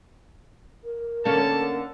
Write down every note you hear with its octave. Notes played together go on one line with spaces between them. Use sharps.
A#4
D3 A#3 C#4 A5